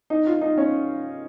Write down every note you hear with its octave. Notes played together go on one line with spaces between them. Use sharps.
D#4
F4
D#4
C#4